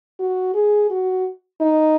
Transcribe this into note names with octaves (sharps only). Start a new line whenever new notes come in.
F#4
G#4
F#4
D#4